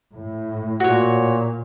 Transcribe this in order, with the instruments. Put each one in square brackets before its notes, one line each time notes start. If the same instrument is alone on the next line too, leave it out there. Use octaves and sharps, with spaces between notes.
[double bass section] A2
[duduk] A#2 [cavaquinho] F#4 C#5